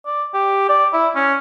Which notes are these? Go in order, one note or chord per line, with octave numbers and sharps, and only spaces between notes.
D5
G4
D5
E4
C#4